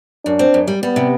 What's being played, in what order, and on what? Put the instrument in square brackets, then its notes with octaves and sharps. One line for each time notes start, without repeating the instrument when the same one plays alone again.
[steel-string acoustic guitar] F#2 [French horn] D4
[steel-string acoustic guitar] C4
F#2
G3
[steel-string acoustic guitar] G3 [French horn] B3
[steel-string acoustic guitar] C3